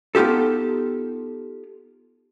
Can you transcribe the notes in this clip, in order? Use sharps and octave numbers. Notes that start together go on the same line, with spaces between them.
B3 D#4 F4 G4 A4